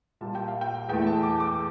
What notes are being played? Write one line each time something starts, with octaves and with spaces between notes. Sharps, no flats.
A#2 G3 A#3 A5
G5
F5
G5
E2 E3 A3 G5
A5
D6
D6